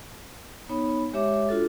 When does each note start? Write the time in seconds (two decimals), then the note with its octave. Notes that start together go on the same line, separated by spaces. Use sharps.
0.69 B3 D#4 C#5 B5
1.13 G#3 G4 C#5 E5 D6
1.49 D4 F4 F#4 A4